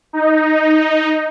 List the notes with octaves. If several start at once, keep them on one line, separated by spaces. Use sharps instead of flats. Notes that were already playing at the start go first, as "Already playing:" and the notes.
D#4